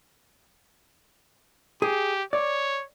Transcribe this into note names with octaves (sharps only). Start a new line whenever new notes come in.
G4 G#4
C#5 D5